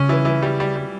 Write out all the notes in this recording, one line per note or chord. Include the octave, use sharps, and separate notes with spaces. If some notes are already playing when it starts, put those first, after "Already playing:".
Already playing: C#3 C#4
E3
E3
G3
G3
G3